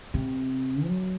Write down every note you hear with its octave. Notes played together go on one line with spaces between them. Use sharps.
C3
F#3